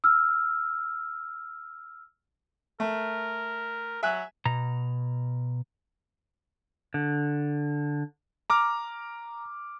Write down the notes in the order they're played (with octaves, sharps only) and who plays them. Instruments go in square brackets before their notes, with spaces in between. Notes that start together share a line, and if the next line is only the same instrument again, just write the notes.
[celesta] E6 F6
[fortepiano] A3 [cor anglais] A#4
[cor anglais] F#3 [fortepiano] E5 G#5 F#6
[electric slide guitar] B2 A#5
D3
[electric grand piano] A#5 D6 F6